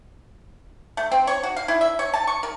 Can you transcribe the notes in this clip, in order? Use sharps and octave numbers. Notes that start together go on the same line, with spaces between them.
A3
C4
C#5
F#4
F5
E4
E5
C#5
A5
C#6
A#4